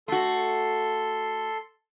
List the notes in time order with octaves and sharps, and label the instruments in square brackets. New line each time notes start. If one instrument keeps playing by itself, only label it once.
[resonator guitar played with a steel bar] A3 F#4 [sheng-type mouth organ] A4 C6